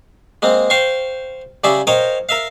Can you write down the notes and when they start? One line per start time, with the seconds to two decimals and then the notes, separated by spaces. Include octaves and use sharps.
0.42 G#3 A#3 C4
0.70 C5 F5 G5 C6 C#6
1.64 C#3 G3 G#4 D5 E5
1.87 A#4 C5 C#5 D#5 F5 G5
2.29 A#4 E5 F5